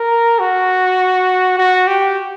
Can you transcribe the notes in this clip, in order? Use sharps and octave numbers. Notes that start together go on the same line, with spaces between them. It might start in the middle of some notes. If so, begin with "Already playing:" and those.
Already playing: A#4
F#4
F#4
G4